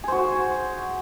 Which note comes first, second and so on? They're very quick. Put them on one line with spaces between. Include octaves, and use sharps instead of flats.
G#4 C5 F#4